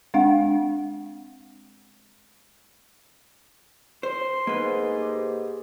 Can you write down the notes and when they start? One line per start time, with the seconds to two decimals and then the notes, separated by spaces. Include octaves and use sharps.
0.14 G#3 C4 D4 F5 F#5
4.03 C5 C6
4.47 G#2 A#3 B4
4.96 G4